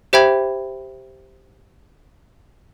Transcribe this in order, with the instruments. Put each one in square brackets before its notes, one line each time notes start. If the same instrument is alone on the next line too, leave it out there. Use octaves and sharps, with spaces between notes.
[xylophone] G4 C5 E5 G5 B5 G#6